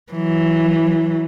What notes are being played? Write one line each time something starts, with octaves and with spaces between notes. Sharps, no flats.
E3 F#3